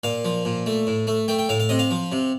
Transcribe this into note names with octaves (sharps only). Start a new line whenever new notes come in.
A#2 F5
F3
A#2
A3
A2
A3
A3 G5
G5
A2 F5
F5
C3 D#5
F5
F3
C3